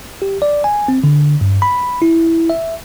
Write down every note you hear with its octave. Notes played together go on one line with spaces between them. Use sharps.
G4
D5
G#5
C4
D3
G2
B5
E4
E5